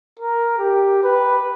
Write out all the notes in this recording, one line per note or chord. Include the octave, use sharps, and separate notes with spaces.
A#4
G4
B4